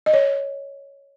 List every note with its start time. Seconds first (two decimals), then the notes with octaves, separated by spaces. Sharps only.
0.06 D#5
0.13 C#5